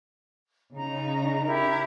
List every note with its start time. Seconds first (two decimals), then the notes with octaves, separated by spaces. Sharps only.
0.75 C#3 D#4 A#5
1.45 E4 G4 A#4